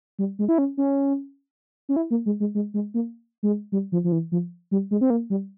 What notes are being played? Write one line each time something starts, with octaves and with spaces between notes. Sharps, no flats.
G3
G#3
E4
C#4
C#4
C#4
E4
A#3
G#3
G#3
G#3
G#3
A#3
G#3
G3
F3
F3
E3
F3
G3
G#3
C4
A#3
G3